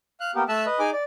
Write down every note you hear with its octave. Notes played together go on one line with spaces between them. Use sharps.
F5 F#6
A#3 B3 G4
A3 E5 A5 E6 F#6
B4 D#5
D#4 G#4 G#5 D6
D5